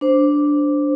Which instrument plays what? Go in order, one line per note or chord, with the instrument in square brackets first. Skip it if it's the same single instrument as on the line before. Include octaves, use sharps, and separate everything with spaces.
[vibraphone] D4 C5